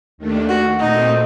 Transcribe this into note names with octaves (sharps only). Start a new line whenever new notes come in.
D#2 D#3 A3 D4
F#4
A#2 A3 C4 D#4